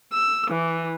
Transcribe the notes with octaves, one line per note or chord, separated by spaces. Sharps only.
E6
E3